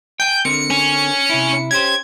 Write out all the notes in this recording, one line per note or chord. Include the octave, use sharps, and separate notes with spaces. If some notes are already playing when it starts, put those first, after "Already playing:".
G5 G#5 G6
D3 C4 A#4 C#7
C#4
C3 E4
C#4 G4 C5 G#6